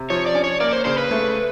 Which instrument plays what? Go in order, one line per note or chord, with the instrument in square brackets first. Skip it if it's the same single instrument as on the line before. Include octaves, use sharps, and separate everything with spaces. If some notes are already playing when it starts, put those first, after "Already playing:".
Already playing: [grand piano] C3
[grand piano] F3 [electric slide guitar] C#5
[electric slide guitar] D5
[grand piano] C#4
[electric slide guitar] C#5
[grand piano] A#3 [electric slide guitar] D5
[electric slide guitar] C5
[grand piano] C#3 [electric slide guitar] C5
[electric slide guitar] B4
[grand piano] A3